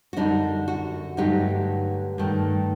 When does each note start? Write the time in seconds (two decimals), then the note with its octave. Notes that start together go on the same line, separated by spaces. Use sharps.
0.13 F#4
0.17 F#2 D3 G3 D4 D#4
0.68 F#4
1.17 G2 D3 F#3 A3 D#4 G4
2.18 G2 D#3 A3